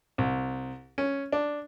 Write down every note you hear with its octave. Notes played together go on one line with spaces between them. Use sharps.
C2
C#4
D4